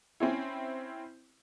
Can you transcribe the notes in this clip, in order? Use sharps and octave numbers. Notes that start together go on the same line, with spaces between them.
C4 C#4 E4